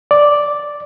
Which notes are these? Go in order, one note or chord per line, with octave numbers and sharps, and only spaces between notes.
D5